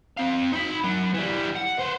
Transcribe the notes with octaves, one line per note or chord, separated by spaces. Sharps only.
C4 F5
D#4 B5
F#2 F#3
E3 G3
F#5
B4 C5